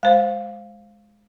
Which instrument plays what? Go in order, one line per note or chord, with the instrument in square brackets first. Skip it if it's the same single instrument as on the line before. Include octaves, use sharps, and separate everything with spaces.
[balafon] G#3 C5 [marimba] F5